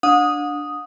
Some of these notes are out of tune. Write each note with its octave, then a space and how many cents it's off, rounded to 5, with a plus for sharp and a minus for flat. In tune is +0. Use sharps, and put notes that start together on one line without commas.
D4 +0 F#5 -40 D#6 +0